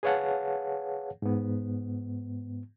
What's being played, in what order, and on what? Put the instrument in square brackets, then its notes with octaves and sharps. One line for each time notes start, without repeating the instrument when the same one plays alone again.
[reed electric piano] G#4 B4 C#5 F5 F#5 A5
G#2 B3